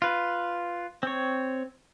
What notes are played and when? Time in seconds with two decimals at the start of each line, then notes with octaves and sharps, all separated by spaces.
0.02 F4 B4
1.03 C4 C#5